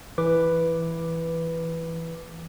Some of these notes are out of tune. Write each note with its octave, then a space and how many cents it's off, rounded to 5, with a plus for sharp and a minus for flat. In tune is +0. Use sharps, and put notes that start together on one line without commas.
E3 +0 B4 +0 D6 +0